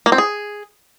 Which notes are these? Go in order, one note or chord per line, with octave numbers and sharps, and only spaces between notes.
A#3
C4
G#4